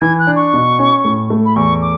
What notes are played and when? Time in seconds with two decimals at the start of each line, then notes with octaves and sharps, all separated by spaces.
0.01 E3 G#6
0.19 F#6
0.27 D4
0.36 C#6
0.54 B2
0.79 C#4
1.05 A2
1.30 A3
1.45 B5
1.56 E2 C#6
1.82 D6